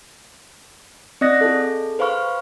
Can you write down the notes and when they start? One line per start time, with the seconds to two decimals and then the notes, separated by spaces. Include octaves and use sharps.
1.21 C4 D5 D#5 D#6 F#6 A#6
1.41 F4 G#4 A4
1.99 B4 C5 F5 B5 C#6 F6